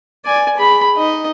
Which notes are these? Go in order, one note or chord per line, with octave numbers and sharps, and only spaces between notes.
D5 G#5
G#4 B5
D#4 D#5